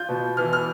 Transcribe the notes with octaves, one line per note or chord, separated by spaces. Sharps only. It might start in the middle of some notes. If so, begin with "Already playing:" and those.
Already playing: F4 G6
B2
E3 F6
F6